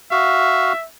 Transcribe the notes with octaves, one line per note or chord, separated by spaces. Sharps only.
F#4 E5 F5